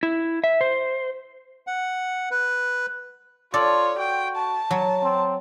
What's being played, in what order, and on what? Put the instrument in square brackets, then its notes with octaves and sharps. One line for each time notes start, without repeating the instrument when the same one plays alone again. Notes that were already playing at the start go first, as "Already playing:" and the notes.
[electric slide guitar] E4
E5
C5
[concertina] F#5
B4
[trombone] F4 [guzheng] A4 D5 [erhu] C#5
[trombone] F#4 [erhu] G5
[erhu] A5
[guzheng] F#3
[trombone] C4